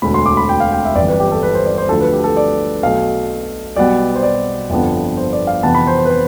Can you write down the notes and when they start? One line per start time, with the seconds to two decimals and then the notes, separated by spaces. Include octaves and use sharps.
0.02 E1 D2 D3 B5
0.14 C6
0.26 D6
0.37 B5
0.49 G5
0.60 F5
0.72 G5
0.85 E5
0.95 G1 F2 E3 D5
1.08 B4
1.20 G4
1.32 A4
1.43 B4
1.55 C5
1.66 D5
1.78 C5
1.89 D2 D3 F3 A4
2.01 B4
2.13 G4
2.24 A4
2.37 D5
2.83 B1 B2 A3 F5
3.76 B1 B2 G3 B3 D5
4.15 C5
4.23 D5
4.70 G1 F2 D3 F3 B3
5.17 C5
5.33 D5
5.47 F5
5.63 F2 C3 E3 B3 A5
5.75 B5
5.87 C5
5.99 C5
6.05 B4
6.10 C5